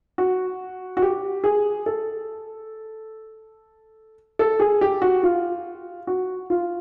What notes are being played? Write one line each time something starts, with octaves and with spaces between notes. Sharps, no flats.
F#4
F#4
G4
G#4
A4
A4
G#4
G4
F#4
F4
F#4
F4